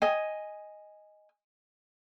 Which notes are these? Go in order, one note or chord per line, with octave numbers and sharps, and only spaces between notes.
D#5 G#5